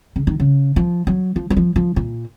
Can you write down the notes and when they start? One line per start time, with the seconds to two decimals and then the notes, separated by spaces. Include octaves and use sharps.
0.16 C#3
0.27 D#3
0.40 C#3
0.76 F3
1.07 F#3
1.36 F3
1.50 F#3
1.57 F3
1.76 F3
1.96 A#2